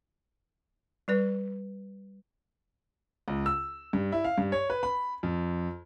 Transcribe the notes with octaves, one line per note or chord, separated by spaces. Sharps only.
G3 B4 D5
C#2
E6
G2
E4
F5
G2
C#5
B4
B5
F2